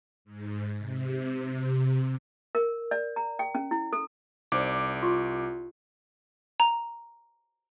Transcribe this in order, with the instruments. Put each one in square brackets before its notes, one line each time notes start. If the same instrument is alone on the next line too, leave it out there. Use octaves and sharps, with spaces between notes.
[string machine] G#2
C3
[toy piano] A#4
D5
A#5
G5
C#4
E4
A4
[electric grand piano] C2 D6 [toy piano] D#4 C5 D5
[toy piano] F4 C6 C#6
[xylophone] A#5